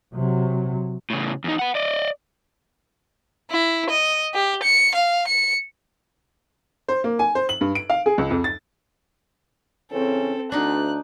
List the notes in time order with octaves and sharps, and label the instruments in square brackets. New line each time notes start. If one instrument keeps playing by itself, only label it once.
[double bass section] C3 F#3
[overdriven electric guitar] A2 C#3
E2 D#4
B4 F#5
D5 D#5
[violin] E4
D#5
G4
C#7
F5
C#7
[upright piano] C5
A#3
G#5
C5
F#7
G2
D7
F5
G#4
C#2
F2
A6
[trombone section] C#3 E3 C#4 [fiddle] C4 A4
[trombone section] D2 [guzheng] D4 D#4 [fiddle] F#6